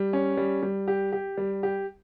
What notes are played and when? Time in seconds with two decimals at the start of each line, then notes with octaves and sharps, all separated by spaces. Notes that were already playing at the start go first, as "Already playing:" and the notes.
Already playing: G3
0.13 C#4
0.37 G3
0.63 G3
0.88 G4
1.12 G4
1.37 G3
1.63 G4